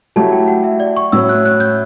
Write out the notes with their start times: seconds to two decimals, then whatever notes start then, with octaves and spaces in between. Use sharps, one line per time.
0.16 F#3 A3 E4 G4 A5
0.32 G5
0.48 F#5
0.64 E5
0.80 D5
0.97 C#6
1.12 A2 F#3 C#4 E6
1.29 F#6
1.45 F#6
1.60 G6